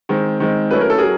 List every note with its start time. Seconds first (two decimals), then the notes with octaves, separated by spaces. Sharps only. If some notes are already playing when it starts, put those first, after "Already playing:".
0.09 D#3 G#3 C4
0.40 D#3 G#3 C4
0.71 F#3 A3 C#4 E4 B4
0.81 A#4
0.90 A4
0.98 F#3 G#4 A#4